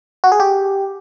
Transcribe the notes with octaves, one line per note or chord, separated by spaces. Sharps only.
F#4
G#4
G4